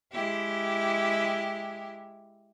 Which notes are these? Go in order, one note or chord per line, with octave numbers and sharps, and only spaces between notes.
G#3 E4 G4